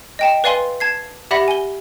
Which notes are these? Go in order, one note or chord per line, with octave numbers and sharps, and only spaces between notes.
D#5 G5 A5
B4 D5 F5 G#5 C6
A5 G#6 C7
G4 D5 E5 F#5 B5 A#6
G#5 G7